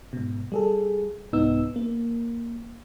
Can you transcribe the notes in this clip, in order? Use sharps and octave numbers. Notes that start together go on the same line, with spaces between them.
G#2 B2
G3 G#4 A4
C2 G#2 B3 D#4 E6
A#3